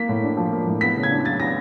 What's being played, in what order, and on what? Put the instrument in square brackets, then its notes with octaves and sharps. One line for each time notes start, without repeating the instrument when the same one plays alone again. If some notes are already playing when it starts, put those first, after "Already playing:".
Already playing: [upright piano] A#3 B6
A2
D4
F3
A#3
A2
B3 B6
C#3
G#6
D4
F#3 A6
B3 A#6